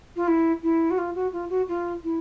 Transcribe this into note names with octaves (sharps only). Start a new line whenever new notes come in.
F4
E4
E4
F#4
F4
F#4
F4
F#4
F4
E4